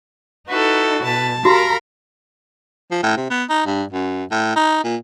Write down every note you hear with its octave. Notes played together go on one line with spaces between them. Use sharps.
D#4 E4 F#4 A4 B4
B2 B4 A5
F#4 G4 A#4 F5 A#5 B5
F3
A2
C3
B3
D#4
G2
F#2
A2
D#4
A#2